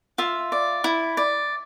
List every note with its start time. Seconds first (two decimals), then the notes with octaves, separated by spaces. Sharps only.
0.18 F4 E5
0.52 D5
0.84 E4
1.17 D5